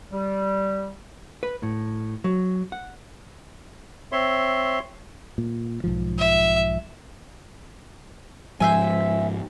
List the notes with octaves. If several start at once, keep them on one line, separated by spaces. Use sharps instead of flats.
G3
B4
A2
F#3
F#5
C4 C#5 E5 C6
A#2
B1 G#2 F3
E5
G#2 F3 G#3 C5 E5 G#5